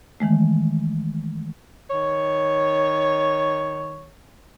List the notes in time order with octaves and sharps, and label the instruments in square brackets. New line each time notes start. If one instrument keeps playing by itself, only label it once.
[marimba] D#3 E3 G#3 A3
[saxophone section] D#3 C#5